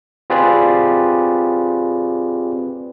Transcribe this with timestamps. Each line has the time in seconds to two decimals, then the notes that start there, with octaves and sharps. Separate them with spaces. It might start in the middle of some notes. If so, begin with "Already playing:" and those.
0.30 C4 F4 G4 G#4 B4 D5